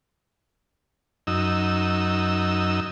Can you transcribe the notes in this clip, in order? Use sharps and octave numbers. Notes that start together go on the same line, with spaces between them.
F#2 D#4 E6